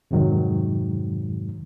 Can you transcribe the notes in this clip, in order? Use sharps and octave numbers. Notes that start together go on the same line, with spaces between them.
F2 G#2 C3 D#3 F#3 G#3